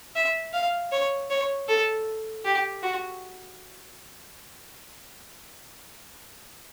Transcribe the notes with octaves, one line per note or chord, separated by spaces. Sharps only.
E5
F5
C#5
C#5
A4
G4
F#4